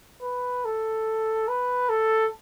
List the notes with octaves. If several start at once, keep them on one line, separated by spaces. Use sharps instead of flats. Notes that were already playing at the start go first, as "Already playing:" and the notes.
B4
A4
B4
A4